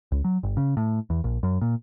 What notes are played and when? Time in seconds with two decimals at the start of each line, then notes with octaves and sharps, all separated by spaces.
0.12 C#2
0.24 F#3
0.43 G1
0.57 C#3
0.77 A2
1.10 E2
1.24 A#1
1.43 F#2
1.61 A#2